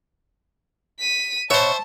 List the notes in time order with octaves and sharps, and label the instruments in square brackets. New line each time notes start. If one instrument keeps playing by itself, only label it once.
[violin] B6 D#7
[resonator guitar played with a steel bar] B2 C#5 [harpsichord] C5 E5 [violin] A5